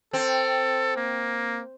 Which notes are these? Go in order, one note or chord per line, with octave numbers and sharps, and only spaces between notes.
C4 A4
A#3